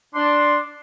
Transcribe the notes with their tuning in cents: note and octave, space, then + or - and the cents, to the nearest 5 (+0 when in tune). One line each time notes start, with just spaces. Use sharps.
D4 +0 C6 +0